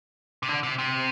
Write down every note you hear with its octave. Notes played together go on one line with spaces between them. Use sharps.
C3
D3
C3
C3